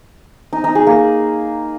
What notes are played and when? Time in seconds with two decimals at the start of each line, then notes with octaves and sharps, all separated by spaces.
0.53 D#4
0.64 D#4
0.75 G#4
0.87 A#3